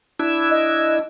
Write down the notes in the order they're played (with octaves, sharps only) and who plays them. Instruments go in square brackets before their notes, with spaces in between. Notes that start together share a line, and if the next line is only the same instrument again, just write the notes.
[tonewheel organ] D4 E4 E6
[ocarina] D#5